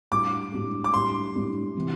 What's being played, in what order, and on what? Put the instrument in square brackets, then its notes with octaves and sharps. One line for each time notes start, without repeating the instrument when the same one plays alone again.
[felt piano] A2 G3 D4 G4 [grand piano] D6
[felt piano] A2 G3 D4 G4
[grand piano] D6
[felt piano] A2 G3 D4 G4 [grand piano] C6
[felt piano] A2 G3 D4 G4
C3 E3